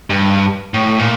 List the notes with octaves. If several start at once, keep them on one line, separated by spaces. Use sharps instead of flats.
G2
A2
A#2